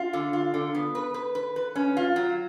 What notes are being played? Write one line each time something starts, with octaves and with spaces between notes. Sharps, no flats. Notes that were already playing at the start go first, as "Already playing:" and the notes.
Already playing: F4
D3
F4
D3
B3
B4
B4
B4
B4
C#4
F4
F#3